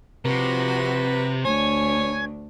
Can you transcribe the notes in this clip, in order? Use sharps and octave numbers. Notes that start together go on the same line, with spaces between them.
C3 F3 F#4 B4 A#6
D2 D4 C#5 G#5